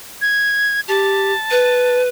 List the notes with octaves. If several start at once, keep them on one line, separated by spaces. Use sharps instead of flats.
G#6
G4 A5
B4